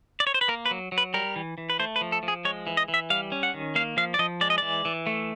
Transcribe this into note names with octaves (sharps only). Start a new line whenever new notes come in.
D5
C#5
C5
B4
A#3 A#4
B4
F#3
F#3
B4
G3 A#4
E3
E3
B4
A3 C5
B4
F3
A4
F3
G#4
G#3 C#5
E3
D#5
E3
E5
G3 F5
C#4
F#5
D#3
A#3 F5
F3 F5
D5
F3 D#5
G#3 D5
D#5
E3 D5
E3
A3